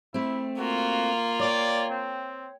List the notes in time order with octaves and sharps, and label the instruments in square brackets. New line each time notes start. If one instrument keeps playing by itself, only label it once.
[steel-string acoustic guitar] A3 C4 [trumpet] E4
[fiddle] A#3 F4 [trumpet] F#4
[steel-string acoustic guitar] C#5 G5 [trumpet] D5
[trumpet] C4